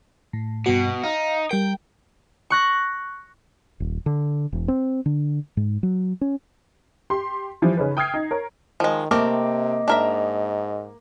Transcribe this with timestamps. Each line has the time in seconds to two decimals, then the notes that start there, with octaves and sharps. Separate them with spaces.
0.33 A2
0.66 G2 B2 B3 F#4
1.04 D#4 F5
1.51 G3 A#4 G5
2.50 C#6 F#6 A#6
3.80 D#1
4.06 D3
4.52 E1
4.68 C4
5.06 D3
5.57 G#2
5.83 F#3
6.21 C#4
7.10 G4 C6
7.62 E3 F3 G3
7.77 C#3 C#4 D#4 B4
7.97 G5 D#6 F6 G#6 C7
8.14 D#4
8.31 A#4 C#5
8.80 D#3 F3 G#3
9.11 C3 A3 A#3 C4 A#4 D#5 D6
9.88 G#2 D4 A#4 E5